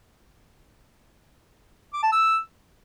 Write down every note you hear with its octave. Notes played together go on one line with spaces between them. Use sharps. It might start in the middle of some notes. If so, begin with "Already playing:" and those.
D6
A5
E6